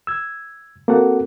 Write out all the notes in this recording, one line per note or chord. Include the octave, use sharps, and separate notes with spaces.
E6 G#6
A#3 C4 F#4 A4 F#5